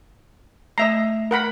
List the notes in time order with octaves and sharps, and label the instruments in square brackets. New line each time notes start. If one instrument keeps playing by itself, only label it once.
[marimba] A3 [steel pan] D#5 E5 A#5
[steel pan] A#4 F#5 B5